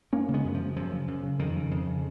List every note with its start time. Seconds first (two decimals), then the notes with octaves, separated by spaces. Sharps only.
0.13 F#2 A#3 C#4
0.28 C#3
0.34 G#3 B3
0.44 F#2
0.54 F3
0.61 C#3
0.76 F#2 F3
0.92 C#3
1.08 F#2
1.23 C#3
1.39 F2 D#3
1.56 C#3
1.71 F2
1.87 C#3